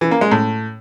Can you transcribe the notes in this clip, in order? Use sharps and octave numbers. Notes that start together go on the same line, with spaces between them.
E3
A#3
G#3
A2